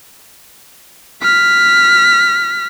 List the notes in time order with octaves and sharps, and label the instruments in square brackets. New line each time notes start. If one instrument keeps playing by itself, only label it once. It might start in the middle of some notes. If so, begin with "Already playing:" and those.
[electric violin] F6 B6